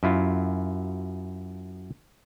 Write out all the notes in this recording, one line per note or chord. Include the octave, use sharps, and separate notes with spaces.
F#2 E4 F4